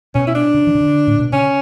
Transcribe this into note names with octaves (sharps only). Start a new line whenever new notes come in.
B2 C#4
E4
D4
C#3
E3
C#3
D3
A2
B2
C#3 C#4